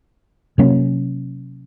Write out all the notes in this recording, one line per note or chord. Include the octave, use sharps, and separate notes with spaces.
C3 F#3 A#3 C#4